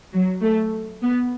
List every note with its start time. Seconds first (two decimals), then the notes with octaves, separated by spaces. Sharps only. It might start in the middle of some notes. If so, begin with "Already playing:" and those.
0.13 F#3
0.42 A3
1.02 B3